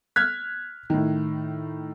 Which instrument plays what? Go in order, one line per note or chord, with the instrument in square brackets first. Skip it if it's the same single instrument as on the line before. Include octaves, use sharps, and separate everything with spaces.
[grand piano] F6 G#6 B6 [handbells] F#6
[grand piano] A2 D#3